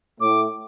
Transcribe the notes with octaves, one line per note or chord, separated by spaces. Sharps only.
A2 D6